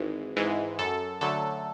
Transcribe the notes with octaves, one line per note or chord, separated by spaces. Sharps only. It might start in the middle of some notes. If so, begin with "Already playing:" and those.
Already playing: G#1 G#2 E3 G#3
G#2 E3 G#3
F#2 A4
D3 F#3 A3 A4